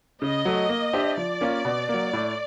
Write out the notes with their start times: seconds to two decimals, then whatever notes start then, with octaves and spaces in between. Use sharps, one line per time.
0.21 C#3 D#5
0.45 F#3 A3
0.69 A#3
0.93 D4 G4 C5 E5
1.17 F3 D5
1.41 A#3 C#4 F4
1.65 B2
1.89 A#3
1.94 F#3
2.13 A2